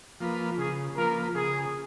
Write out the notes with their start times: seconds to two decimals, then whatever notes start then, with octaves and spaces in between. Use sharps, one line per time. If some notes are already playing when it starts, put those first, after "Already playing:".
0.20 F3 A#3 F4 B4
0.58 C#3 G#4
0.97 F3 A#3 F4 A#4 B4
1.35 C#3 G#4